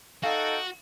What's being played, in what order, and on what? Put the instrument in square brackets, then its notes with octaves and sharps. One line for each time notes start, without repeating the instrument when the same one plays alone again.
[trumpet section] D#4 A4 G5 [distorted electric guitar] F#4 [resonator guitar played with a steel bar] F5